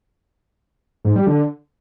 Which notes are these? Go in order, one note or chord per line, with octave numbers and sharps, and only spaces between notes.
G#2
G3
D3